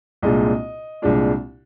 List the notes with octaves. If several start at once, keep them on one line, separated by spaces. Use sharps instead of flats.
C2 A#2 G#3 D4 F4 D#5
C2 A#2 G#3 D4 F4